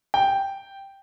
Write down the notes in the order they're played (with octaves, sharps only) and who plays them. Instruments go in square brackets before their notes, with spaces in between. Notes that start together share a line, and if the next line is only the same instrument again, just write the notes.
[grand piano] G5